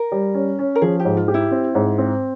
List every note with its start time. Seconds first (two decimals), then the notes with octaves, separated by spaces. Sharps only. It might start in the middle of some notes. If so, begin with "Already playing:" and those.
Already playing: A#4
0.12 G3
0.34 C#4
0.59 C#4
0.75 A#4
0.82 F3 G#4
1.00 G4
1.05 G#2
1.17 F4
1.28 G4
1.34 E4
1.51 C4
1.75 G#2
1.98 C4